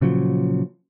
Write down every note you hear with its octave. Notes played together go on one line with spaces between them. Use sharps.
A#2 C#3 F3 F#3